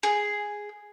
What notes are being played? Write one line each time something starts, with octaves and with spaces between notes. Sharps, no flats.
G#4